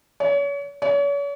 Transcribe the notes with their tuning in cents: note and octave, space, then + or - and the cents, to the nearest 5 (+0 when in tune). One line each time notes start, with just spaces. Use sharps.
C#5 +35
C#5 +40